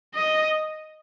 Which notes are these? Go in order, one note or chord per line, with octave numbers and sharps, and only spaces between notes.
D#5